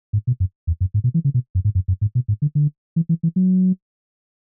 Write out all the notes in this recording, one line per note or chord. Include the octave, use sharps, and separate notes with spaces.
G#2
B2
F#2
E2
F#2
G#2
B2
E3
C#3
B2
F#2
G#2
F#2
F#2
G#2
B2
G#2
D3
D3
E3
E3
E3
F#3